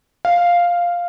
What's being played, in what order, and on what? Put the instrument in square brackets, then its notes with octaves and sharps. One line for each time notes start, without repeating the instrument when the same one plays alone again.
[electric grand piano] F5